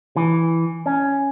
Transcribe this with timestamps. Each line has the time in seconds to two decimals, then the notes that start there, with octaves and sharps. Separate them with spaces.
0.16 E3
0.86 C#4